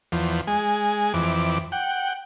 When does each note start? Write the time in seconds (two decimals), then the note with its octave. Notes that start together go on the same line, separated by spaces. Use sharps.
0.12 E2 F3
0.47 G#3 G#5
1.14 F2 E3 D6
1.72 F#5 G5